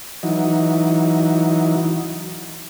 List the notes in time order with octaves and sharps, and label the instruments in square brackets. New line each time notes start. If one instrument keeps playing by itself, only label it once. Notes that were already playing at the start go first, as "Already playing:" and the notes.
[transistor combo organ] E3 F#3 D#4